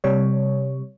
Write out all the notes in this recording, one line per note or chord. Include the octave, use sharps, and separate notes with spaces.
C3 G3 C#5